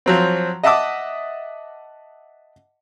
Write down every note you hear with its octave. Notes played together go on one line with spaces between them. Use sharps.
F3 F#3 C4
D#5 E5 F#5 A5 D6 D#6